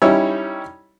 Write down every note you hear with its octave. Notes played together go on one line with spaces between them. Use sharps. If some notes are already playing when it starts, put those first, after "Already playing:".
G3 C#4 D#4 E4 C#5 E6